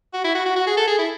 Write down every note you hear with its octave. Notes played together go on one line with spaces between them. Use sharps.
F#4
E4
F#4
F#4
F#4
G#4
A4
G#4
E4